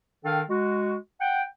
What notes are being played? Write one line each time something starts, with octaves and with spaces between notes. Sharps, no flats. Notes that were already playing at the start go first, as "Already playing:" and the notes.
D#3 D4 A4 F5 G5
G#3 F#4
F#5 G5